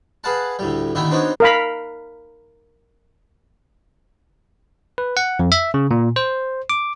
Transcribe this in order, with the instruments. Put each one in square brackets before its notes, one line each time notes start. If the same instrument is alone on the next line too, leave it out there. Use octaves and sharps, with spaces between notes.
[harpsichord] G#4 B4 F5 F#5 A5
D2 A2 G3
A#2 D3 D#3 A3 E4 G4
B3 C4 D4 D#4 F#4 C#5
[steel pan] A#4 F5 B5
[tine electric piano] B4
F#5
F2
E5
C#3
A#2
C5
D6